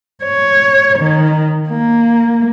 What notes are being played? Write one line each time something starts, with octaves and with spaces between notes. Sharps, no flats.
C#5
D#3
A#3